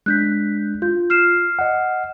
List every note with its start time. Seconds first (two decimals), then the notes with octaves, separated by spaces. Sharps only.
0.06 G#3 D4 F#6 G6 B6
0.82 F4 G6
1.10 F6 C7 E7
1.59 D#5 F#5